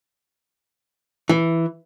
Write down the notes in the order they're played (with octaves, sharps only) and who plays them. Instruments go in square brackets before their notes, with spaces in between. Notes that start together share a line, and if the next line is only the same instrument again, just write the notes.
[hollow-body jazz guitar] E3